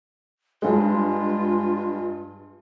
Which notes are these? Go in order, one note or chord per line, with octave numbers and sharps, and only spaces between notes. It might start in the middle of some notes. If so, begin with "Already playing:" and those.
G2 G#3 F4